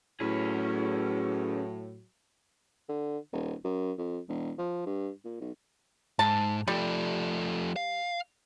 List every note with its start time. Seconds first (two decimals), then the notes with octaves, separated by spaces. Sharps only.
0.20 A2 F#3 C#4 G#4 B4
2.89 D3
3.33 D#1
3.64 F#2
3.98 F2
4.28 E1
4.58 F3
4.86 G2
5.25 A#2
5.40 B1
6.19 G#2 A5
6.68 F3 G3 A3
7.76 F5